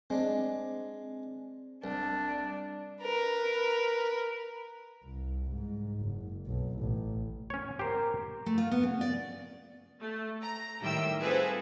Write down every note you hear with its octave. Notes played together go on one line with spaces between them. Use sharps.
G#3 C4 D4
C2 D4
A#4 B4
C2
G#2
F#1
B1
A1
C#4 C#5
G4 A#4 C5
A3
F4
B3
C#3
D5
A3
A#5
A2 D#3 G3 E5 G5 E6
C4 F4 G#4 A4 B4 C5